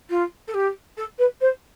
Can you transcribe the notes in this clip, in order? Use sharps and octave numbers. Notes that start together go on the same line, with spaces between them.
F4
A4
G4
A4
B4
C5